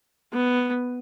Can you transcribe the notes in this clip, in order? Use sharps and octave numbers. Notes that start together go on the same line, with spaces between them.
B3